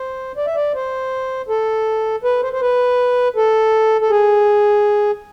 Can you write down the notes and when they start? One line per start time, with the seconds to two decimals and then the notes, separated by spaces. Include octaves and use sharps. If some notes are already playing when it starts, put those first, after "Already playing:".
Already playing: C5
0.37 D5
0.47 E5
0.55 D5
0.75 C5
1.49 A4
2.24 B4
2.43 C5
2.53 C5
2.61 B4
3.36 A4
4.01 A4
4.10 G#4